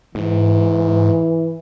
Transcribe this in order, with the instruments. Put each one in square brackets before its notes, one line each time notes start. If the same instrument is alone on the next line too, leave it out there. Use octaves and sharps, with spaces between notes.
[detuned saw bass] G#2 [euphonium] E3